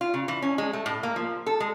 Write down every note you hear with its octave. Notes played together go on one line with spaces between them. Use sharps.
F4
C#3
E3
C#4
G#3
A3
A2
A#3
F3
A4
G#3